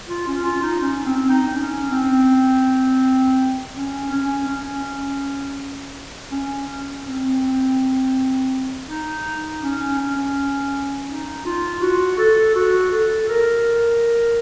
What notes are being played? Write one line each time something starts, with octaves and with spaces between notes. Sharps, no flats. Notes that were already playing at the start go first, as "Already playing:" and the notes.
F4
C#4
F4
D#4
C#4
C4
D#4
C#4
C4
C#4
C#4
C#4
C#4
C4
C4
D#4
C#4
C#4
D#4
F4
F#4
A4
F#4
A4
A#4